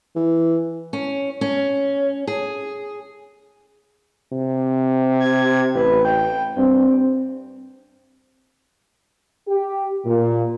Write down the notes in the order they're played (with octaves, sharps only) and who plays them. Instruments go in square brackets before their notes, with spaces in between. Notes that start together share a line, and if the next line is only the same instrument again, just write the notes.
[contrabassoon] E3
[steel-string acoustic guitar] C#4
C#4
G#4
[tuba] C3
[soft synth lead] G#6
[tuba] A1 [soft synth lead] B4
[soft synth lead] G5
[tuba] G2 [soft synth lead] C4
[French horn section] G4
A#2